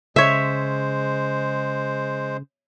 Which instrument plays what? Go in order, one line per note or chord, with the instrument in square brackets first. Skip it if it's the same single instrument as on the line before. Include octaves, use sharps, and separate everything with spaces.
[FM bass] C#3 [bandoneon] G#3 C5 [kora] C#5 E5